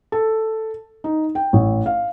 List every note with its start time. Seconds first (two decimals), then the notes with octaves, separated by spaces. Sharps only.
0.12 A4
1.04 D#4
1.35 G5
1.53 A1
1.86 F5